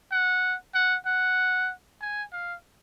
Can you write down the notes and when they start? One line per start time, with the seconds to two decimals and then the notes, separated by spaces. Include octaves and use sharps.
0.12 F#5
0.74 F#5
1.06 F#5
2.01 G#5
2.32 F5